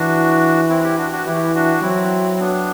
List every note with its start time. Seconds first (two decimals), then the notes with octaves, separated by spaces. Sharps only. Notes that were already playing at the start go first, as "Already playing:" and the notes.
Already playing: E3 D4 F#4
0.69 C4 E4
0.83 E4 G4
0.98 D4 F#4
1.12 D4 F#4
1.26 E3 E4 G4
1.54 D4 F#4
1.83 F#3 C4 E4
2.35 C4
2.40 B3 D4